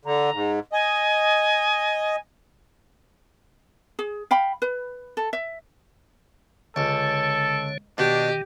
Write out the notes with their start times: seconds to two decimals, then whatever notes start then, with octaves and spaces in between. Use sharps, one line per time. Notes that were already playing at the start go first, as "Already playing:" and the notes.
0.05 D3 A#5
0.34 G#2
0.72 D#5 G#5
3.99 G#4
4.31 F5 G5 B5
4.62 B4
5.17 A4
5.33 E5
6.76 C#2 D3 A4 C#5
7.98 B2 D#3 D4 G4